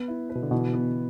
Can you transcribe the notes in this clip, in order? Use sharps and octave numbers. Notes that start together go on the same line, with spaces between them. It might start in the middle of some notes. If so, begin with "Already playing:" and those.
Already playing: B3
E4
B4
B2
D3
B2 E3
B3